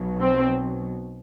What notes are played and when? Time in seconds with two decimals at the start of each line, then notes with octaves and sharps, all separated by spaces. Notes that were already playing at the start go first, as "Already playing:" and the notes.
Already playing: B1 B2 F#3
0.21 C4